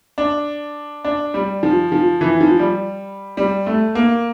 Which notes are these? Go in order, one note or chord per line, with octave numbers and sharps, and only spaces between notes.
D4
D4
G3
F3
F3
E3
F3
G3
G3
A3
A#3